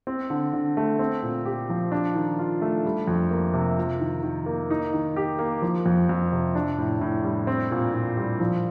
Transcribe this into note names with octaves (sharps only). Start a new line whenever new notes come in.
C4
D3
D3
A3
C4
A#2
G4
F3
D4
D#3
F4
A3
G3
F2
A#3
C3
F4
D#3
D#3
A#3
D#4
D#3
G4
A#3
F3
F2
F2
C3
D4
A2
A2
G3
C4
A#2
A#2
G3
F3